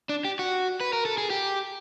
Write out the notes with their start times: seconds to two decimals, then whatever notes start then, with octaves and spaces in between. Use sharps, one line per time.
0.09 D4
0.25 G4
0.39 F#4
0.81 B4
0.93 A#4
1.05 A4
1.18 G#4
1.30 G4